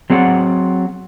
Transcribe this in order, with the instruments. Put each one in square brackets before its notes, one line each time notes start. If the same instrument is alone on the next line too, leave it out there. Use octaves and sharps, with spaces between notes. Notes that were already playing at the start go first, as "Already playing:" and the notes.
[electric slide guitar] F#3 C4 G#4 D5 F#5